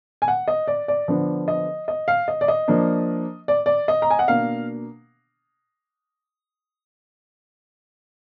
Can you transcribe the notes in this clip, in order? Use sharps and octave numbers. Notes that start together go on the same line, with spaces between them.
G#5
F#5
D#5
D5
D5
D3 F3 B3 D4
D#5
D#5
F5
D#5
D5
D#5
F3 A#3 D4
D5
D5
D#5
A#5
G#5
F#5
B2 A#3 D4 F5